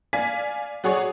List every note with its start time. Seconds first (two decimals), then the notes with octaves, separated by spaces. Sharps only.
0.13 D5 F5 G#5 B6
0.84 F#3 F#4 G#4 C#5 D5